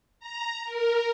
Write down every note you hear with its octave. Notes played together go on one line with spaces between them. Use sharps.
A#5
A#4